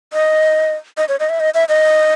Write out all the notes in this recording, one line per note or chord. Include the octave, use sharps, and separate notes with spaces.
D#5
D#5
C#5
D#5
E5
D#5
E5
D#5